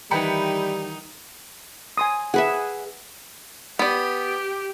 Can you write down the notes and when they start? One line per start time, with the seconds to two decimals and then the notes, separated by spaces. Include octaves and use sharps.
0.11 D#3 E3 G3 D#4 F#5 G5 B5 C#7
1.97 G#5 C6 D#6
2.34 G#4 B4 E5 F#5
3.79 B3 G4 D5